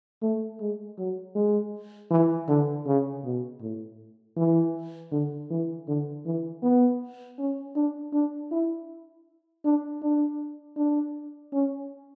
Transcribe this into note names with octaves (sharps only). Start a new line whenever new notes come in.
A3
G#3
F#3
G#3
E3
D3
C#3
B2
A2
E3
D3
E3
D3
E3
B3
C#4
D4
D4
E4
D4
D4
D4
C#4